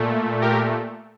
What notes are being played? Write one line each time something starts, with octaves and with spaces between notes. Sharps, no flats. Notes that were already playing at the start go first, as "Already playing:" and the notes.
Already playing: A#2 A3
G4 A#4